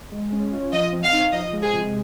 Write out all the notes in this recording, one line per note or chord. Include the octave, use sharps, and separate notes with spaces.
G#3
C#4
F4
F3 D#5
C4
F5
D#4
F3 D#5
G#3
G#4
C3